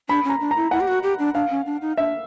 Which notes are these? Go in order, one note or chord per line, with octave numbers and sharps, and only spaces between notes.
D4 B5
C#4
A#5
D4
A#5
E4
E4 F#5
G4
F#4
G4
D4
D4 F5
C#4
D4
D#4
D4 E5